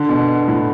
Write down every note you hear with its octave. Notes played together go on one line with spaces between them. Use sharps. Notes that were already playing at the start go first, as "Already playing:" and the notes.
Already playing: D3
B2
A2